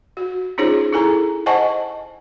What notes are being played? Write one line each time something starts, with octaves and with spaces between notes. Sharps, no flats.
F#4
C#4 D#4 F4 G#4 C5 C#5
E4 G#4 A4 G#5 A#5
C5 D#5 F#5 G#5 A5 C#6